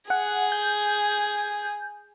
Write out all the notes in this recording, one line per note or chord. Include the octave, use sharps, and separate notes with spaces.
G#4 F#5
G6